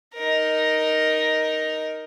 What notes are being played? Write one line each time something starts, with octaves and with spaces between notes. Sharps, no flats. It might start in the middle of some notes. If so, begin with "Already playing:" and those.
D#4 A#4